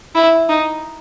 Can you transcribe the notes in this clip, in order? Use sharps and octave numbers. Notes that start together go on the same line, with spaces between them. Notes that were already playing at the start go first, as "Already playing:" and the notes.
E4
D#4